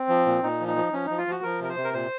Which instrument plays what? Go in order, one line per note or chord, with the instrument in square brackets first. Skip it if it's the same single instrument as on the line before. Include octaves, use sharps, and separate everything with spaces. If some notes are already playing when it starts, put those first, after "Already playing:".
Already playing: [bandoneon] C4
F3
A#2
A#2 D#4
F3
D#4
F3
F3 C#4
F3 D#4
F4
F3 F#4
F3 A#4
C3 A#4
C5
C3
A#4
A#2 C5